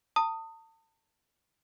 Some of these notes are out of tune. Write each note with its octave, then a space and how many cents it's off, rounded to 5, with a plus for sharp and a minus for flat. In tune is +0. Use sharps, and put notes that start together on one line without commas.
A5 +40 D#6 +0